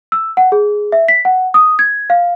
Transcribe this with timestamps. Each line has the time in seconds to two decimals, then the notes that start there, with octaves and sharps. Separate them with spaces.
0.12 E6
0.37 F#5
0.52 G#4
0.92 E5
1.08 B6
1.25 F#5
1.54 D#6
1.79 G#6
2.10 F5